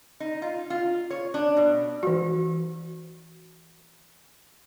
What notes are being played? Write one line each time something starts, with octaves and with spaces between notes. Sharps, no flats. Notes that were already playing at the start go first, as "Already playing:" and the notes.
D#4
F4
F4
C#5
D4
B2
E3 F#4